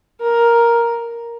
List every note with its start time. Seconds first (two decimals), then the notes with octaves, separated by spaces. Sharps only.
0.21 A#4